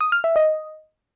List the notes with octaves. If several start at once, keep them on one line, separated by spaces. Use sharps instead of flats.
D#6
F6
E5
D#5